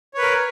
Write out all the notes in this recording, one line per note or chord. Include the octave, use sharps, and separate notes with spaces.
A#4 B4 C#5